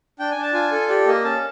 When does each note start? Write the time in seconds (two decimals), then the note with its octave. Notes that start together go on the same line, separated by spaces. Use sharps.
0.19 D4 G5
0.31 G#5
0.36 D4
0.43 A5
0.53 F4 G#5
0.71 A4
0.89 G4 D5
1.06 A#3 D#5
1.24 C#4 A5